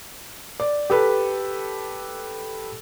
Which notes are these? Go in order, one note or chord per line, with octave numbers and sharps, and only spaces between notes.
D5
G4 A4 B4